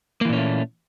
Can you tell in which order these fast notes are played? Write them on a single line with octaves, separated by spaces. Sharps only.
A#3 E3 A#2 C#4 A3